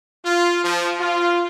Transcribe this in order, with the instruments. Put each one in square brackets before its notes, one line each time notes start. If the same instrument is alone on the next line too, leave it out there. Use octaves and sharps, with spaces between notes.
[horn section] F4
F3
F4